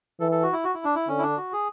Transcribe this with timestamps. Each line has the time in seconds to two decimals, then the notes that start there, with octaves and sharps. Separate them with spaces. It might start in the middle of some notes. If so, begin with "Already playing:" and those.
0.20 E3 A4
0.32 A4
0.43 F#4
0.53 E4
0.64 F#4
0.74 E4
0.85 D4
0.95 E4
1.08 D3 C#4
1.19 E4
1.22 D4
1.37 F#4
1.53 G#4